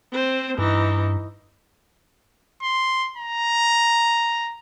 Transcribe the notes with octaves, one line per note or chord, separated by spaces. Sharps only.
C4 C5
G2 E3 D#4
C6
A#5